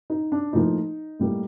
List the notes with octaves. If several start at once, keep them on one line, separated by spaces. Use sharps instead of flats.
D#4
D4
A2 F3 A#3 D#4
A2 G3 A#3